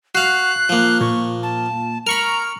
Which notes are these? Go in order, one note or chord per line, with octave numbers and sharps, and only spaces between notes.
F#4 F5 F#6 C7
F3 A#3
A#2 C#6
A5
A#4 A#5 B5 C#6 F6